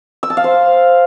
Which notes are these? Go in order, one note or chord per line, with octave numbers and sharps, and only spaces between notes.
E6
A5
F5
C5